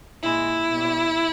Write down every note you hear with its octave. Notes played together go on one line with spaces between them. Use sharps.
A#2 G#3 E4
B2 G3